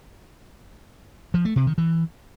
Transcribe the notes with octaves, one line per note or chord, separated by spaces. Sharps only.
F3
A3
C3
D#3
E3